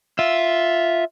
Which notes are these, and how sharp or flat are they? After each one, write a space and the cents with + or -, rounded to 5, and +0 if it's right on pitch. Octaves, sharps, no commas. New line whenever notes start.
F4 +0 E5 +0